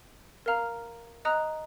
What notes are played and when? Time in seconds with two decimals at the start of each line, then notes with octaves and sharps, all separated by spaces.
0.46 A#4 F5 A#5 F6
1.25 D#5 A#5 D#6 F#6